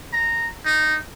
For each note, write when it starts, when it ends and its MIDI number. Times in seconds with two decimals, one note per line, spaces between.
0.13 0.48 82
0.65 0.96 63